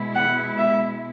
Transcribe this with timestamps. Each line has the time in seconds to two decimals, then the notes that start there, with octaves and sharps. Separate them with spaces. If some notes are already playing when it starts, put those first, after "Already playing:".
Already playing: B2 G#3 E4
0.15 F#5
0.58 E5